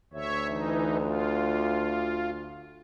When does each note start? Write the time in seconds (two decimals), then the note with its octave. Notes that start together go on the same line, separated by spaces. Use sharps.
0.13 D2 C#5 E5
0.47 E3 D#4
1.03 F4